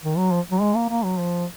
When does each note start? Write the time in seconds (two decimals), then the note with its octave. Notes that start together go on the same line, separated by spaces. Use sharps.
0.03 D#3
0.17 F#3
0.32 F3
0.51 F#3
0.61 G#3
0.75 A#3
0.90 A#3
1.04 F#3
1.19 F3